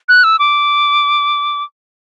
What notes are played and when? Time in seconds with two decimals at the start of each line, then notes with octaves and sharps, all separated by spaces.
0.09 F#6
0.24 E6
0.39 D6